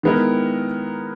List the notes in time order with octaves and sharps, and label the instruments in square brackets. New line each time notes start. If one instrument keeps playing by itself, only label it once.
[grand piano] D#3 G#3 B3 E4 A#4